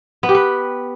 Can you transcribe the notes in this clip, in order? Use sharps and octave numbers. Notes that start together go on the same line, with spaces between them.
B3
G4
B4